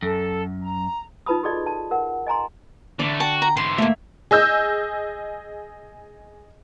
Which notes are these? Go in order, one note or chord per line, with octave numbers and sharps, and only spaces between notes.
F#2 A4
A#5
D#4 F4 B4 A5 B5 D#6
F#4 G#4 A4 D5 D#5
A5
A#4 F#5
D#5 G#5 A#5 C6
D3 E3 A3 D5 D6
F#4 G5 A5
A#5
G#2 E3 C6
A3 A#3 E5
G#4 D#5 E6 G6